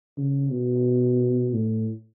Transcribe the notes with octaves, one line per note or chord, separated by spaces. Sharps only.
C#3
B2
A2